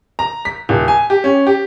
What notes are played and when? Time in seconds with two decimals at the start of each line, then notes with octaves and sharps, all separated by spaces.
0.19 A#5
0.45 B6
0.69 D#1
0.88 G#5
1.10 G4
1.24 C#4
1.47 G4